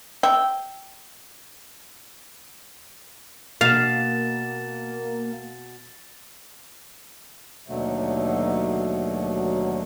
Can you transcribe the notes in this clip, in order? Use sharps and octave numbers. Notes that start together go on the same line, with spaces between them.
E5 G5
B2 A#3 F5 A6 E7
D#2 B2 D3 F#3 A3